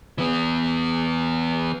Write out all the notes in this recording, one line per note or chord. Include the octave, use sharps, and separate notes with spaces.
E3 B3